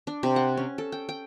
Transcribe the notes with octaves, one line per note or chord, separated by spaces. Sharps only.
D4
C3
F#5
C#4
A4
G5
G5